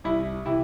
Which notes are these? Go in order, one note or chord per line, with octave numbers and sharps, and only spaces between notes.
C2 E4
C3 E3 E4